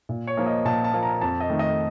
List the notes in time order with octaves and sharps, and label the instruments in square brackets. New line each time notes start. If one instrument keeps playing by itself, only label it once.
[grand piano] A#2
C#5
F3 A#3
D#5
A#2 A5
A5
F3 A#3
A#5
F2 A5
D#5
D#3 A3
D#5